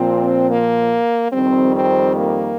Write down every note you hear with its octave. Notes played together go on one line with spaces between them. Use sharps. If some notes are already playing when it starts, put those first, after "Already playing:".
Already playing: A#2 F3 C4
A#3
F2 D#3 G3 C4
C4
A#3